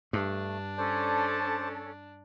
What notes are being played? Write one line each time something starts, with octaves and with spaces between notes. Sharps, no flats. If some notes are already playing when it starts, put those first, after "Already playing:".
G2 A3 D4
C#4 A4 C5 D5 A5